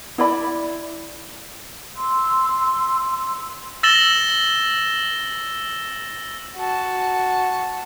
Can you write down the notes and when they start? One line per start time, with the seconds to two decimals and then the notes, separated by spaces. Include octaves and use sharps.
0.18 E4 D5 B5
1.96 C6 E6
3.83 E6 A6 A#6 E7 F#7 G7
6.57 F#4 A5